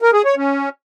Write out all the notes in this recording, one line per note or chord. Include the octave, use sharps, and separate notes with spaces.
A#4
G#4
C#5
C#4